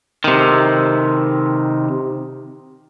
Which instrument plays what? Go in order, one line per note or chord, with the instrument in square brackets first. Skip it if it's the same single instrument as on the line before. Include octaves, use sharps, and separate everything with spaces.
[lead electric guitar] C3 D#3